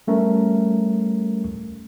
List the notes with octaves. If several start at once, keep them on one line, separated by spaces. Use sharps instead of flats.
G3 A3 C#4 A#4